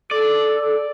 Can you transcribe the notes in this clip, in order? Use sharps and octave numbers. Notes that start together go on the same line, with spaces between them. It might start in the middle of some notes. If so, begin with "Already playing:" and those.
A4 D5